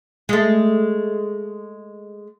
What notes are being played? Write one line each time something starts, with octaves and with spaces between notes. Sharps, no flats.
G#3 A3